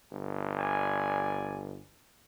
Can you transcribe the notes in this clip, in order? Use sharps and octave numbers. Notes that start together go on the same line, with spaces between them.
G1
D5 G#5